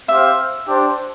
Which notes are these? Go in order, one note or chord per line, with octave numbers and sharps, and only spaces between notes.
C4 G4 C5 E5 F5
D4 G4 C5